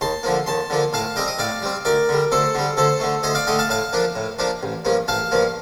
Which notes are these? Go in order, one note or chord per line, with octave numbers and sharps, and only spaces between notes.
D#2 A5 C6
D3 F3 A#3
D#2 A5 C6
D3 F3 A#3
A2 F5 A5
G3 C4 D#5 G5
D#5
A2 D5 F5
G3 C4
D2 A#4 D5
D3 G3
D2 A4 C5
D3 G3
D2 A4 C5
D3 A3
D2 C5 D#5
D5 F5
D3 A3 D#5 G5
F5 A5
A2 F5 A5
F3 A#3 D4
A2
F3 A#3 D4
A1
G2 F3 A#3
A1 F5 A5
G2 F3 A#3